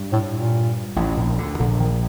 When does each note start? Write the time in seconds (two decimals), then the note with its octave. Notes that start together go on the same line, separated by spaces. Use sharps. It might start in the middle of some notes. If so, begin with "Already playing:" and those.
Already playing: G2
0.12 A2
0.34 A#2
0.96 A1 A2
1.17 A#1 A#2
1.38 D2 D3
1.59 A#1 A#2 D3
1.80 D#3